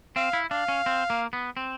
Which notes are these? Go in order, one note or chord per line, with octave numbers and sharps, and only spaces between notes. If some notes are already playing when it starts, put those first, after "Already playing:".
C4 F5
E4
D4 F5
C#4
C4
A#3
B3
C4